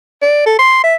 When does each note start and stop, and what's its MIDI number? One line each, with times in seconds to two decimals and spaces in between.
0.22 0.46 74
0.46 0.58 69
0.59 0.81 84
0.84 0.96 76